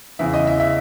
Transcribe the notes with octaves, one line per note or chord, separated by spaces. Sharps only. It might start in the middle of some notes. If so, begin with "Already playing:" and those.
E2 C#3 E3 E5
D#5
E5
E5